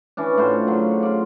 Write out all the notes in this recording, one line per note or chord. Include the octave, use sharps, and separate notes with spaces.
E3 C#4 D4
A2 F4 F#4 C5
C#3 F#3
F4 D5